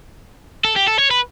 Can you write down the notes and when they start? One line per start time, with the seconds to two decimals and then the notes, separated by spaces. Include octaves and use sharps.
0.65 A4
0.76 G4
0.88 A4
0.99 C#5
1.11 B4